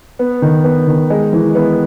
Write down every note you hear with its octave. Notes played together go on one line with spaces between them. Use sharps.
B3
D#3
B3
D#3
G#3
E3
B3